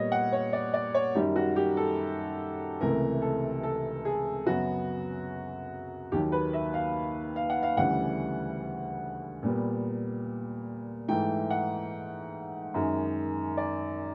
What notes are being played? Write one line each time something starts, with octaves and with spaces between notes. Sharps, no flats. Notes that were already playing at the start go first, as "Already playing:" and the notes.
Already playing: A#2 G3 B3 C#5 D#5
F#5
C#5
D5
D5
C#5
F#2 D#3 G3 G4
F#4
G4
A4
C#2 C3 E3 A3 A#4
A4
A4
G#4
F#2 C#3 F#3 B3 F#4
D#2 D#3 F#3 G4
B4
E5
F5
F5
F#5
F5
D2 C#3 E3 G3 F#5
A#2 G3 B3
G#2 E3 A3 G5
F#5
F#2 D#3 G#3
D5